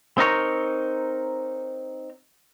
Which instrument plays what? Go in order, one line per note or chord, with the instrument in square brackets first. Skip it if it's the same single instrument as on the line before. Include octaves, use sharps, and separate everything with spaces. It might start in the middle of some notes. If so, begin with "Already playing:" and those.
[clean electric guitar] C4 D#4 A#4 C#5